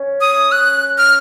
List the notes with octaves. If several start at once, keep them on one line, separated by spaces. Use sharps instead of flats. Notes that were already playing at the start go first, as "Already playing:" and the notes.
Already playing: C#4
D#6
F#6
F6